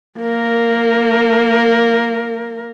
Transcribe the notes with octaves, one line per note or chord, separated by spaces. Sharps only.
A#3 A#4